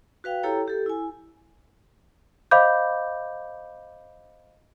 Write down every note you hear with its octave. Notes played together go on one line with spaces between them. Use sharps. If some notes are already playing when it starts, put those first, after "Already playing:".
F#4 B4 F5 G5
E4 G4 A4 C#5 G5 A#5
G4 A4
E4 G#5
C5 D#5 F5 B5 D6 G6